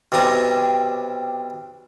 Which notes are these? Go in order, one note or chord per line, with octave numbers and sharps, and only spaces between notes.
B1 C3 G3 G#5 A#5